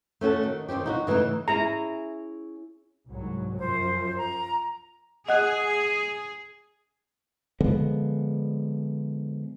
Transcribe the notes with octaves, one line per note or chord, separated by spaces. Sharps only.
A3 C#4 F#4 A4
D#3
D#3 C4 C#4 G4
D#4 E4 F#4
C#3 E3 G#3 A3 D#4
C#4 E4 G#4 A#5
C2 G#2 F#3
F#2 F3 C5
A#5
G#4 D#5 F#5 F#6
D3 F3 G#3 B3